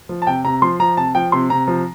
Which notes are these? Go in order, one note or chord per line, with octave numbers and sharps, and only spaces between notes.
F3
A5
C3 G5
C3 A#5
F3 C6
F3 A#5
C3 A5
F3 G5
C3 C6
C3 A#5
F3